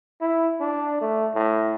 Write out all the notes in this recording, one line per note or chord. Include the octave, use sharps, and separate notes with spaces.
E4
D4
A3
A2